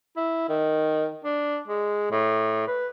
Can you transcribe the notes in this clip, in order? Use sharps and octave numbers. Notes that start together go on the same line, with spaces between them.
E4
D#3
D4
G#3
A2
B4